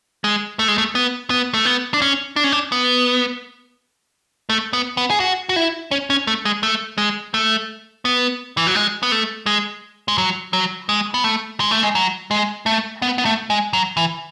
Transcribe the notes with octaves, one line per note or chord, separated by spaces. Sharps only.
G#3
A3
G#3
A3
B3
B3
A3
B3
D4
C#4
D4
C#4
D4
B3
A3
B3
B3
G#4
F#4
F#4
E4
C#4
C#4
A3
G#3
A3
G#3
A3
B3
E3
F#3
G#3
B3
A3
G#3
G#3
F#3
F#3
G#3
B3
A3
G#3
A3
G#3
F#3
G#3
A3
B3
B3
A3
G#3
F#3
E3